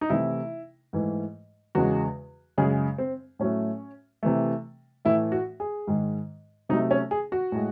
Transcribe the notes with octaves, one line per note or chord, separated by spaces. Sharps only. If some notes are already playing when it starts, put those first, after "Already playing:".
D#4
C3 E3 A3 E4
G#2 E3 A3
E2 C#3 G#3 F#4
F#2 C#3 G#3 G#4
C4
A2 F#3 A3 C#4
C3 E3 A3
A2 E3 A3 E4
F#4
G#4
G#2 D#3 G#3
C3 F#3 A3 D#4
C#4
G#4
F#4
A2 G#3